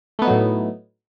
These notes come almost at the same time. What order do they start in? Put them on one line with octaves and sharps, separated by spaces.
A3 B3 D#4 F#3 A2